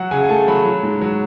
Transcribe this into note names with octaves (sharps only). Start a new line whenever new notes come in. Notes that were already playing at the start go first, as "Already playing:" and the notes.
Already playing: F#3 F#5
C#3 G#5
G#5
A3 A5
F#3 B5
F#3
G#2
F#3